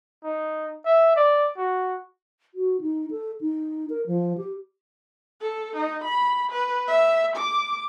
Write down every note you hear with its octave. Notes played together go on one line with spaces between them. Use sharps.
D#4
E5
D5
F#4
F#4
D#4
A4
D#4
A#4
F3
G4
A4
D#4
B5
B4
E5
D6